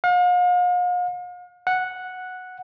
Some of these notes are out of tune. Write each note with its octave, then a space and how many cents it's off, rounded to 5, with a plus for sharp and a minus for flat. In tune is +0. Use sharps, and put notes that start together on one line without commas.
F5 +45
F#5 -5